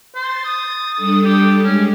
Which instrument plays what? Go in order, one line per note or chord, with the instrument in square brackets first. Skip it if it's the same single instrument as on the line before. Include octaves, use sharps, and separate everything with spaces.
[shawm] C5 [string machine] A6
[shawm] D#6
[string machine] G3 D4 A4
[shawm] G4
[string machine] G#3 [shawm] C#4